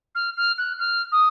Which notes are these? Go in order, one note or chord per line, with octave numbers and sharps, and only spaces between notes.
F6
F6
F#6
F6
D#6